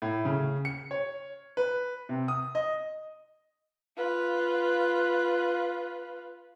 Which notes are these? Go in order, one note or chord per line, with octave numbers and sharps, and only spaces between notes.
A2
C#3
C#7
C#5
B4
C3
D#6
D#5
F4 B4